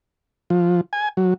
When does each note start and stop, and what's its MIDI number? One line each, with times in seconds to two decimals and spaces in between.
0.50 0.81 53
0.93 1.09 80
1.17 1.34 54